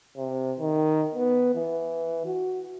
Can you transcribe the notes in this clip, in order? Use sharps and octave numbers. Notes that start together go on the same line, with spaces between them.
C3
D#3
B3
E3
F#4